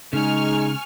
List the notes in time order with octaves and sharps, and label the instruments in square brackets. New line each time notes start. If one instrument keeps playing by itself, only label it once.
[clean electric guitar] C#3 [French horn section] G#3 [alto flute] D#4 [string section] G#5 C#6 F6